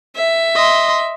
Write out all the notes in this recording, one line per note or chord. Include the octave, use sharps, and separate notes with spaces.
E5
D#5 C6